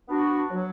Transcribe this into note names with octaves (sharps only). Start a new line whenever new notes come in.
B3 D4 F#4
F#3